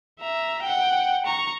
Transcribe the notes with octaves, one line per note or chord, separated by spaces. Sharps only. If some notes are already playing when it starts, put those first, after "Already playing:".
E5 A#5
F#5 G5
A#5 C#6